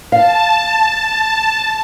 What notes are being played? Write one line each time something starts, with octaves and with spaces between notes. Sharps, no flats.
F5 A5